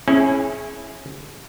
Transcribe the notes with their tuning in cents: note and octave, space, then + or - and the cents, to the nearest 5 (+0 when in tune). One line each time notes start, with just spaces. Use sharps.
C#4 -25 E4 +0 G#4 +15